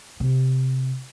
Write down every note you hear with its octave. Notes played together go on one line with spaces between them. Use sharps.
C3